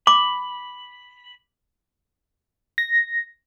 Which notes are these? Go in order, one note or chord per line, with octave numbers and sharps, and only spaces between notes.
B5 D6
A#6